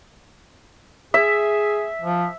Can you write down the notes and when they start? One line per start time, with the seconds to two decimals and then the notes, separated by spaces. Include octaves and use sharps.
1.14 G#4 E5
2.01 F3